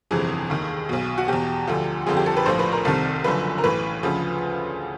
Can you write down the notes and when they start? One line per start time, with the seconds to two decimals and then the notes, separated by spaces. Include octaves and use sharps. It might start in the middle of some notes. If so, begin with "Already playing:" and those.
0.11 G1 F2 C3 E3 G#4
0.50 D#2 D#3
0.89 B1 B2
1.18 F#4
1.28 E2 B2 G4
1.67 D2 D3 F3
2.06 G1 F2 D3 F3 G#4
2.17 G4
2.26 A4
2.37 B4
2.46 A#1 A2 F3 C5
2.59 B4
2.72 A#4
2.85 C2 C3 D#3 A4
3.24 F#1 F#2 D3 F3 B4
3.58 A#4
3.64 B1 A2 E3 B4
4.03 D2 C#3 F3